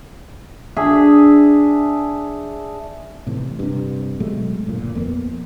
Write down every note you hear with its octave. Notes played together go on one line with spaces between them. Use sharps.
D4 G#4 E5
A2 C3 E3
G2 C3
B2 F#3 G#3 A3
G1 A#2
F2 A#3 B3